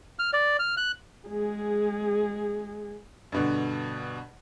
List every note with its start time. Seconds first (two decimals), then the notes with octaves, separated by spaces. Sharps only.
0.19 F6
0.33 D5
0.59 F6
0.77 F#6
1.28 G#3 G#4
3.32 G2 B2 D3